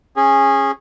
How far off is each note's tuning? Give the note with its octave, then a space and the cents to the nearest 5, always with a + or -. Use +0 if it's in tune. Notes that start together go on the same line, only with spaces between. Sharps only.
C#4 -20 G#4 -15